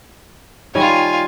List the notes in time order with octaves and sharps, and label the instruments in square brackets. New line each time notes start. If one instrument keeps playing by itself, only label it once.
[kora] D#3 G3 C#5 [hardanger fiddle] F4 G#5